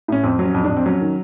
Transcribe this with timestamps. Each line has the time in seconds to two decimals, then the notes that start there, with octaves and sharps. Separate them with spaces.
0.08 A2 C#4
0.24 F2 C4
0.39 F#3
0.45 C#4
0.54 F2
0.64 D4
0.70 F2
0.77 C4
0.86 F#3 C#4
1.01 D#3